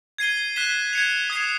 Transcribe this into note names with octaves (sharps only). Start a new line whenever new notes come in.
G#6 C7 D#7 G7
F#6 B6 E7 G7
G#6 C#7 F7
D#6 G#6 C7 E7